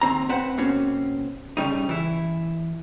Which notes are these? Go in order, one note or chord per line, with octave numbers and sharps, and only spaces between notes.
D#2 C4 A#5
C4 B4 C5 F#5
B2 A#3 C4 C#4
G2 C#3 G3 D#4
E3 E4